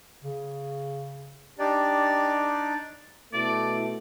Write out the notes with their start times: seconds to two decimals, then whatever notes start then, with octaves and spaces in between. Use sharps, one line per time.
0.23 C#3
1.59 D4 D#4 G4 D5
3.33 B2 A3 E4 D5